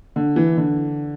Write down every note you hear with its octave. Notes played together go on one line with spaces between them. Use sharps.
D3
E3
D3